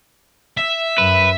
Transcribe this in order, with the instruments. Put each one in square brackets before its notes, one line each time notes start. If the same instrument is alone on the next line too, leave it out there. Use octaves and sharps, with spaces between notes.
[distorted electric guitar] E5
[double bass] F#2 [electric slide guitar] B4